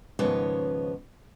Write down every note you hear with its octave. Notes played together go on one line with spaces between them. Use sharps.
D#2 G#2 C#3 F3 B3 C#5